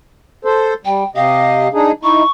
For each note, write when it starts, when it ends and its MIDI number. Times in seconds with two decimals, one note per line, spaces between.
0.45 0.74 69
0.45 0.74 72
0.85 1.04 55
0.85 1.06 79
1.16 1.68 48
1.16 1.68 67
1.16 1.68 75
1.16 1.69 77
1.74 1.91 62
1.74 1.91 63
1.74 1.91 68
2.03 2.23 63
2.03 2.23 64
2.03 2.31 85